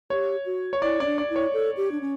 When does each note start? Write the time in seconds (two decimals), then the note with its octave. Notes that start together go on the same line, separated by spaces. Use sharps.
0.10 G4 C#5
0.46 F#4
0.73 C#5
0.82 E4 D5
1.00 C#4 D5
1.06 D4
1.18 D5
1.30 E4
1.36 C#5
1.54 A4
1.77 G4
1.92 D4
2.01 C#4